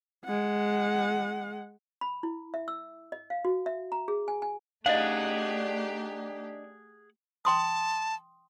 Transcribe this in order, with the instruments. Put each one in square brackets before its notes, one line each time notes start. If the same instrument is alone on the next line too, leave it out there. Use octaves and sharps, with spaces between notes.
[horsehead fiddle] G#3 F#5
[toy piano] B5
E4
E5
E6
D#5
F5
F#4
E5
A#5
G#4
G#5
G#5
[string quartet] A3 G4 [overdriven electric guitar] D4 D#4 [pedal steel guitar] G#4 F#5 [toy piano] D#5 F5
[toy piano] G5 C6 D#6 [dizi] A5